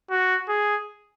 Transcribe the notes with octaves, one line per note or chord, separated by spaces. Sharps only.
F#4
G#4